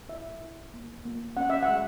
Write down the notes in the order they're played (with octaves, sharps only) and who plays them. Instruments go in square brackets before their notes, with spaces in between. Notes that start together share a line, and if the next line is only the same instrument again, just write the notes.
[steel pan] E4 E5
E4
A#3
A#3
C#4 F#5
E5
F#5
G#3